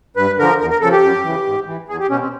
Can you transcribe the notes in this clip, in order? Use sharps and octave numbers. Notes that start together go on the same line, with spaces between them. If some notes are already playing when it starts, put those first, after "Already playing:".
G2 B4
D3 F3 A#4
E2 A#4
A#4
C#3 F3 A4
G4
F#2
C#3 E3
G#2
E3
E2 G#4
G4
B2 C#4
C4